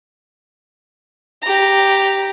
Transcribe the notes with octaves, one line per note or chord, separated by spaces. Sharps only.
G4 A#5